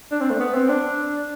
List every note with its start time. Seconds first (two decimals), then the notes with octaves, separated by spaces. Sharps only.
0.11 D4
0.21 C4
0.31 A3
0.40 B3
0.54 C4
0.69 D4